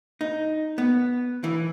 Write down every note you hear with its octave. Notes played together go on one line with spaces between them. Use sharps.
D#4
B3
E3